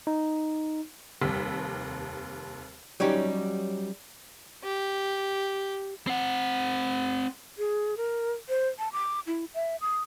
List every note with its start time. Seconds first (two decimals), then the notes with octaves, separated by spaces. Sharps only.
0.07 D#4
1.22 F1 D#2 G3 E6 B6
3.00 F#3 G3 C#4 D#4 G4
4.64 G4
6.07 C4 F#5
7.58 G#4
7.97 A#4
8.49 C5
8.79 A5
8.92 D6
9.27 E4
9.54 E5
9.81 D#6